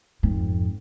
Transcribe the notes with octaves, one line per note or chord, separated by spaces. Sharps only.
F2 G#2